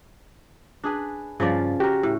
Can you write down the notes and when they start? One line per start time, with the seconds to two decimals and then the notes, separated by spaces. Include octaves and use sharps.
0.84 D4 G#4 B4
1.40 G2 C#3 F3 D5
1.80 F#4 G4 A#4
2.03 A2